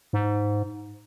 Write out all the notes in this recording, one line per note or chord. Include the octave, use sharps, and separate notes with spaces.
G#2